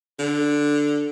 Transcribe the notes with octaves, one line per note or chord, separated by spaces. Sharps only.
D3